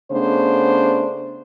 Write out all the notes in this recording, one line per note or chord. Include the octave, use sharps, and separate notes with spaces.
C#3 A3 B3 D4 C5